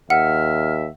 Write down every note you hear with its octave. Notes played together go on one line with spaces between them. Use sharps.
D#2 E5 F#5 F6